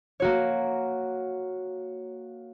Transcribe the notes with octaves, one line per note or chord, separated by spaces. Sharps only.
A#3 F#4 C#5